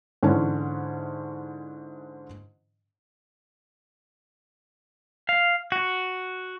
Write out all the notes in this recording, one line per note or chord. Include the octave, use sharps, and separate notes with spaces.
G#2 D3 E3 C#4
F5
F#4